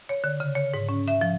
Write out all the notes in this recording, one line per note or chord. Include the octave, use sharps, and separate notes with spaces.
C#5
D3
C#3
C#5
G#2
C#4
E5
F3